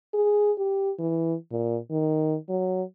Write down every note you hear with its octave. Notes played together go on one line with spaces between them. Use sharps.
G#4
G4
E3
A#2
D#3
F#3